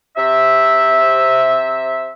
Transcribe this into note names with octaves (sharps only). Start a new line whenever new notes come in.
C3 E5